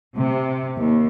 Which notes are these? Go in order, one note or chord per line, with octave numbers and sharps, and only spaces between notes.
C3
D#2